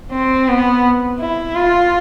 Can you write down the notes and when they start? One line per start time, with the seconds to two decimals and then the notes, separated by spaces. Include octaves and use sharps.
0.12 C4
0.48 B3
1.20 E4
1.55 F4